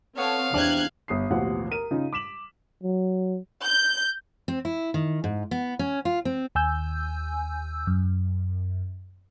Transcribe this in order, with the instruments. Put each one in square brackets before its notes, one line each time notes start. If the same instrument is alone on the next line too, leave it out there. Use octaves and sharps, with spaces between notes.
[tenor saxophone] B3 [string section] C4 A4 C#5 [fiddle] F5
[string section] E2 F#6 G#6 [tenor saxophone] C3 [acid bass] D4
[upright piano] G1 D#6 C7
A1 D#2 B2 F3 F5 F#5
A#4 D#7
C#3 D#4 F4
D6 B6 E7 F#7
[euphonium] F#3
[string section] G6
[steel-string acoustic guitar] C4
E4
D#3
G#2
B3
C#4
F4
C4
[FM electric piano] D#2 G#5 E6 G6
F#2